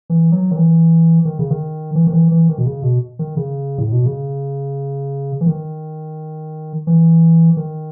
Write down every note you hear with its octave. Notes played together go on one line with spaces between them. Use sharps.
E3
F#3
D#3
E3
D#3
C#3
D#3
E3
D#3
E3
E3
D#3
B2
C#3
B2
D#3
C#3
A2
B2
C#3
E3
D#3
E3
D#3